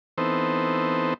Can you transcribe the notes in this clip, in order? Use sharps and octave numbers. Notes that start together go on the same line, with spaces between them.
E3 B3 C4 D#4 A4 C5